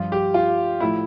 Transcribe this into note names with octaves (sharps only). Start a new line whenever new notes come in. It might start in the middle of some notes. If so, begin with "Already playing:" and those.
Already playing: G2 F3 F4
G4
F4
A2 F3 E4